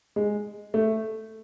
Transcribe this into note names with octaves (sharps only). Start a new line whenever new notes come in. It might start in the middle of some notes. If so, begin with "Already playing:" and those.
G#3
A3